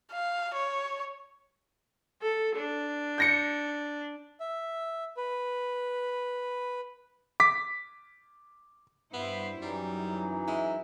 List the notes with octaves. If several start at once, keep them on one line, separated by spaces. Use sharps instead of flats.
F5
C#5
A4
D4
G6 A#6 C#7
E5
B4
D6 B6
G2 B3 E4 C5
F#2 E3 F#3 G3 D#4
G#3 E4